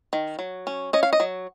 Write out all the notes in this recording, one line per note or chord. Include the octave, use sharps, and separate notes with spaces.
D#3
F#3
C#4
C#4 D#5
F5
D#5
F#3